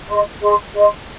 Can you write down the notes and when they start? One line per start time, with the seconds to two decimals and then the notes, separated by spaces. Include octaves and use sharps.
0.08 G#4 D#5 C6
0.41 G#4 D#5 C6
0.74 G#4 D#5 C6